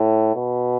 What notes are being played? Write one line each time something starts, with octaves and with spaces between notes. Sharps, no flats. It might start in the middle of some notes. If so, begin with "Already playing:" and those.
Already playing: A2
B2